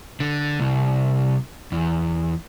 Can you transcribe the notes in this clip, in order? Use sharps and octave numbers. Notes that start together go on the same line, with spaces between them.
D3
C2
E2